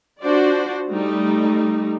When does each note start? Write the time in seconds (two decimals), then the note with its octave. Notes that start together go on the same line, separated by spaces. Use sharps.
0.21 D4 F4 F#4 C5 D5
0.90 G3 A3 D#4